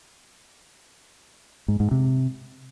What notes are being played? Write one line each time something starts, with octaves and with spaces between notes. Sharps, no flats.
G#2
G#2
C3